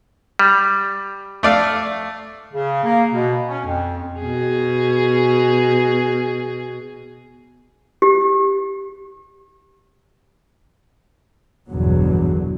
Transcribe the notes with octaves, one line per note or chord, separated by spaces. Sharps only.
G3
A3 D5 F5
C#3
A#3
B2
C#4
F2
B2 G#4
G4
G#1 E2 G2 B2 D3 F#3